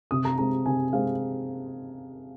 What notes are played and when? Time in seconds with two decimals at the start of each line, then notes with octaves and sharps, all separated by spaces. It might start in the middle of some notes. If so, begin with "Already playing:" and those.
0.11 C3 D#6
0.25 A#5
0.38 G#3 C4 A#5
0.66 C3 G#5
0.93 G#3 C4 F5